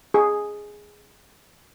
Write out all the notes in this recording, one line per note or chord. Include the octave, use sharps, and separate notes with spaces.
G#4